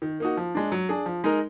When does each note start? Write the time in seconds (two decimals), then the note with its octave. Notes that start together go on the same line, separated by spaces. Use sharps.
0.02 D#3
0.20 A#3 D#4 F#4
0.37 F3
0.55 G#3 D4
0.72 F#3
0.89 D4 G#4
1.06 F3
1.24 G#3 D#4 A#4